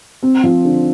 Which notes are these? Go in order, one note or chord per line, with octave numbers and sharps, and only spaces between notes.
C4
F3
D3